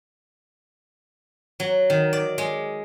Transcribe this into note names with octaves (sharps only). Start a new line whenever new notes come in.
F#3
D#3
D5
G#3